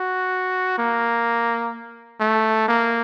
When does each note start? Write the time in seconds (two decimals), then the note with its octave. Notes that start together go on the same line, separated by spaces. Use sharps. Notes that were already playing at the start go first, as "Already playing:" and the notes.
Already playing: F#4
0.78 A#3
2.20 A3
2.68 A#3